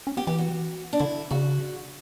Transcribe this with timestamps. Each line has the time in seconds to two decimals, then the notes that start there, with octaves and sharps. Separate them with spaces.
0.07 C#4
0.17 B3 G4
0.27 E3 G4
0.38 F#4
0.93 D4
0.99 D3 E4
1.30 C#3 F#4